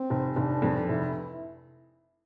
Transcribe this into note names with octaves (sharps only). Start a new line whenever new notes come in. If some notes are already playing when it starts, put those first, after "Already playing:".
Already playing: C4
F1
F1 D4
F2
F1 E4